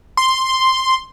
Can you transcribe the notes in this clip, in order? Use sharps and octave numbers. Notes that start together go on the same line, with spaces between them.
C6